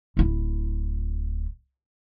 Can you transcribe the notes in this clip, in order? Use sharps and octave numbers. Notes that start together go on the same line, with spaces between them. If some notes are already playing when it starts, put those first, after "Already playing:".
D1 E4